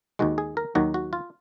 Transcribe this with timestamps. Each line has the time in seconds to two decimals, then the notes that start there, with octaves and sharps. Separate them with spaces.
0.19 D#2 D#3 G#3 F#4
0.38 G#4
0.57 A#4
0.75 D#2 D#3 F#3 F#4
0.94 F#4
1.13 F4